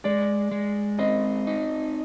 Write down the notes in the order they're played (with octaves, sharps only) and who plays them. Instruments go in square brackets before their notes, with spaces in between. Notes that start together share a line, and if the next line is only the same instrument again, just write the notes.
[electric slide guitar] G#3 [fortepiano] D5
[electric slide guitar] G#3
[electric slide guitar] C4 [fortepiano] D#5
[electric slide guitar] D#4